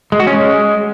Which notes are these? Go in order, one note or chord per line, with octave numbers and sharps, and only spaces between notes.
G#3
F#4
C#4
G#3